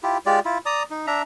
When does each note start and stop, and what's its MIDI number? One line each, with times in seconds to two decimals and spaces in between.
0.03 0.18 64
0.03 0.18 65
0.03 0.18 67
0.26 0.40 56
0.26 0.40 65
0.26 0.40 67
0.26 0.40 74
0.45 0.58 64
0.45 0.58 65
0.66 0.83 74
0.66 0.83 82
0.66 0.83 87
0.90 1.06 63
1.07 1.22 62
1.07 1.22 76
1.07 1.22 82